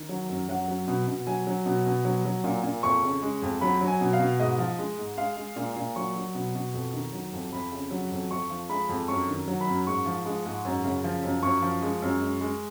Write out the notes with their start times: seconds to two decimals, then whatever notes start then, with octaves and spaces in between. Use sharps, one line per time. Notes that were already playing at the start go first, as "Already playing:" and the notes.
Already playing: D#3
0.09 F#3
0.29 F#2
0.48 F#3 F#5
0.68 F#3
0.87 B2
1.07 B2
1.27 F#3 G#5
1.47 F#3
1.66 B2
1.86 B2
2.05 F#3
2.25 F#3
2.44 A#2
2.63 A#2
2.83 F2 C#6
3.02 C#3
3.22 G#3
3.42 F2
3.61 F#3 B5
3.81 F#3
3.87 G#5
4.01 B2
4.13 F5
4.19 B2
4.39 G#2 D#5
4.58 F3
4.79 G#3
4.98 G#2
5.18 G#3 F5
5.37 G#3
5.56 A#2
5.76 A#2
5.96 F#3 C#6
6.16 F#3
6.35 B2
6.55 B2
6.74 F2
6.94 D#3
7.13 F#3
7.33 F2
7.52 F2 B5
7.72 C#3
7.91 F#3
8.11 F2
8.31 F2 C#6
8.50 F3
8.69 G#3 B5
8.89 F2
9.08 F#2 C#6
9.28 D#3
9.48 F#3
9.61 B5
9.67 F#2
9.87 G#2 C#6
10.06 F3
10.26 G#3
10.45 G#2
10.65 F#2
10.84 C#3
11.04 F3
11.23 F#2
11.43 F#2 C#6
11.62 F3
11.82 G#3
12.02 F#2
12.21 G#3
12.41 G#3